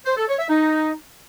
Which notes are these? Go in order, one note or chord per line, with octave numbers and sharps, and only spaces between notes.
C5
A4
C#5
E5
D#4